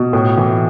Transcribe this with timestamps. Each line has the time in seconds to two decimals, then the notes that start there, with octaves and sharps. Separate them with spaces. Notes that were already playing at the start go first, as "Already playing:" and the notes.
Already playing: B2
0.13 A2
0.38 E3